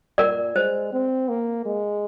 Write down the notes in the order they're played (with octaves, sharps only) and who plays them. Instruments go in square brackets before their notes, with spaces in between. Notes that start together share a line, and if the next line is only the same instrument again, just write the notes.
[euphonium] A#2 [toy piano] A#4 D5
[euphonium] G#3 [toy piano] C5
[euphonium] C4
A#3
G#3